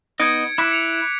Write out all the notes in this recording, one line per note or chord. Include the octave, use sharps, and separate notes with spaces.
B3 D#4 D#5 G#6 C#7 D7
E4 D6 F#6 B6
C#7 F7